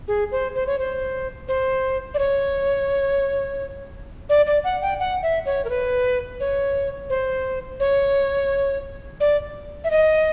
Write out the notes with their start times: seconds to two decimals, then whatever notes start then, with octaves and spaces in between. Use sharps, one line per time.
0.08 G#4
0.32 C5
0.55 C5
0.67 C#5
0.79 C5
1.48 C5
2.14 D5
2.19 C#5
4.29 D5
4.47 D5
4.64 F#5
4.82 G5
4.99 F#5
5.23 E5
5.46 C#5
5.65 A#4
5.70 B4
6.40 C#5
7.10 C5
7.80 C#5
9.20 D5
9.84 E5
9.91 D#5